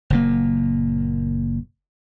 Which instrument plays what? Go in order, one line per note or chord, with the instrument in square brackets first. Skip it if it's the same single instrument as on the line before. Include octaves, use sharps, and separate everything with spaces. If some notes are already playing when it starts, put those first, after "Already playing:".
[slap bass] F#1 A#2 A#3